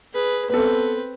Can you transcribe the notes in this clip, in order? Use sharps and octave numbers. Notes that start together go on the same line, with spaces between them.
G#4 B4
B3 C4 A4 B4